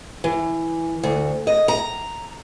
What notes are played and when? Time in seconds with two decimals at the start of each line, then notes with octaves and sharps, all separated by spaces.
0.24 E3
1.03 D2
1.47 D#5
1.68 A#5